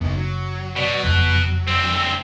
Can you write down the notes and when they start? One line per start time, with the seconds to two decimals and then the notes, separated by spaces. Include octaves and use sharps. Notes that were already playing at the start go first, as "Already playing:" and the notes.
0.01 F#1 F#2 B3 D#4
0.16 F#3
0.76 B2 D5
1.04 F#1 F2 F3 F#6
1.68 D2 C4 E6